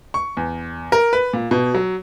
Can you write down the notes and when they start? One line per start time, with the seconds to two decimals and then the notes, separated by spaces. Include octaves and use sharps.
0.14 C#6
0.37 E2
0.92 A#4
1.13 B4
1.33 A#2
1.51 B2
1.74 F#3